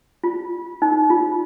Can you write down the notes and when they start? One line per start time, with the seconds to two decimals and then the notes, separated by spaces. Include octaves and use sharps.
0.24 F4
0.82 D#4
1.10 F4